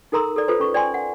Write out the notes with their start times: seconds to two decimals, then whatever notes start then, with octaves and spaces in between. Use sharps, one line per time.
0.12 D#4 A4 A#4 A#5 C6 E6
0.36 A4 D5
0.48 F4 A4 B4 C5
0.60 C#4 A4 C#6
0.74 D5 G5 G#5 C6
0.94 F#5